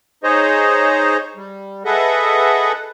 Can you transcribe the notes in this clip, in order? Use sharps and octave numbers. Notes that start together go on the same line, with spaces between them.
D#4 G#4 C5 C#5 D#5
G3
G#4 A4 B4 D#5 E5 F#5